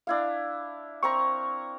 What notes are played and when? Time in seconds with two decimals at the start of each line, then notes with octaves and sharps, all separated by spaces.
0.07 D4 E4 F5
1.03 C4 A#4 A#5 C#6